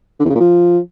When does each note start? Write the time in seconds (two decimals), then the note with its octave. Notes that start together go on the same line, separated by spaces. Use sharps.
0.20 D3
0.25 E2
0.30 C#3
0.35 A#2
0.40 F3